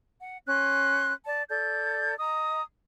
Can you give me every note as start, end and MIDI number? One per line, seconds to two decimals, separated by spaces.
0.21 0.38 78
0.47 1.13 61
0.47 1.13 84
0.47 1.13 90
1.25 1.42 74
1.25 1.42 81
1.50 2.15 69
1.50 2.15 74
1.50 2.15 91
2.19 2.61 75
2.19 2.61 82
2.19 2.61 87